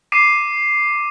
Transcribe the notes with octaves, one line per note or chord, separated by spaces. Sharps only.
D6 C7 D#7